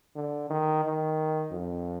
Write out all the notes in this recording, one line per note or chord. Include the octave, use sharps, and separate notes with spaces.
D3
D#3
D#3
F2